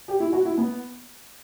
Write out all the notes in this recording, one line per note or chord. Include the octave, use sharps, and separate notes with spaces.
G4
E4
F#4
E4
B3